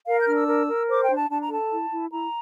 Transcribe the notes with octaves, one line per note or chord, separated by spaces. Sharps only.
A#4 F5
G6
D4 F6
E6
A#4
A#4
C5 D6
G5
D4
A5
D4 A5
A#5
A4 A5
E4
E4
E4 A#5